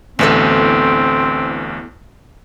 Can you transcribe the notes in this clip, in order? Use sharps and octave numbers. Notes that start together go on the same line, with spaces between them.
A1 D2 B3 C4 E4 A4